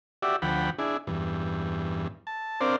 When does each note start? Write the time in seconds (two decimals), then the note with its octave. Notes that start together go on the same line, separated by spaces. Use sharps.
0.22 F#4 G4 D5 E5
0.42 D2 F3 F#5 G5 B5
0.79 D4 E4 G#4
1.07 E2 G2
2.27 A5
2.61 C4 D4 A#4 C5 D5 F5